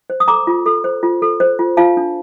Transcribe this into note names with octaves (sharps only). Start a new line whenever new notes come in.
C5
D#6
A4 A#5 D6
F4
A4
C5
F4
A4
C5
F4
F4 F5 A5
D4